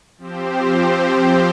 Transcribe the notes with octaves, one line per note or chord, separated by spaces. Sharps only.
F3 C4 G4 C5